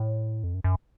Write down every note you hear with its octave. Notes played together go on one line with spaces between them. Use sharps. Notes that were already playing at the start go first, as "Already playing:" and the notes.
Already playing: A2
F2
F#2
F#2